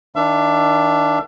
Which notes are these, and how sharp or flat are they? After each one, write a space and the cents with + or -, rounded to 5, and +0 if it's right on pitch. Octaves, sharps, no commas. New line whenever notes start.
D#3 +25 D4 +0 E5 +40